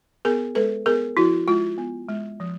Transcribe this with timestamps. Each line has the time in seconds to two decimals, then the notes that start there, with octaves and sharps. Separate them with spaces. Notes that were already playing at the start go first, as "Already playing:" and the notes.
0.25 B3 G#4 A#4
0.55 G#3 A4 B4
0.86 B3 G#4 A#4
1.17 F3 E4 F#4
1.48 G#3 F4
1.78 B3
2.09 G#3
2.40 F3